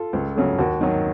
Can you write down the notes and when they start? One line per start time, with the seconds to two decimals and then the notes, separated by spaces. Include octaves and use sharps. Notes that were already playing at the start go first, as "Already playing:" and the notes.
Already playing: F4 A4
0.13 C#2
0.36 C#3 F#3 A3
0.59 D#2 F#4
0.81 D#3 F#3